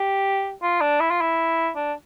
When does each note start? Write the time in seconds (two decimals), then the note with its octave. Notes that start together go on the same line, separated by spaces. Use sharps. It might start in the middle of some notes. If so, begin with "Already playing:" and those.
Already playing: G4
0.62 F4
0.81 D4
1.00 E4
1.11 F4
1.21 E4
1.76 D4